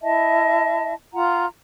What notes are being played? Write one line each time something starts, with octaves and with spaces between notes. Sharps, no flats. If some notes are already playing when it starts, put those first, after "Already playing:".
E4 D#5 E5 A5
F4 F#5 A#5